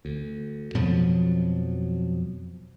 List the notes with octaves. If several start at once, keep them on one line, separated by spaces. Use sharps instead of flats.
D2
F2 B2 F3 F#3